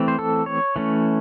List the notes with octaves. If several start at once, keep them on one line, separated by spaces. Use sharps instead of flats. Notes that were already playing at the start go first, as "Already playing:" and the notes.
Already playing: E3 A3 C4
C5
A4
C#5
E3 A3 C#4